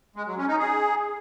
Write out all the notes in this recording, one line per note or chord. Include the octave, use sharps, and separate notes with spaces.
G#3
F#3
C#4
D#4
G#4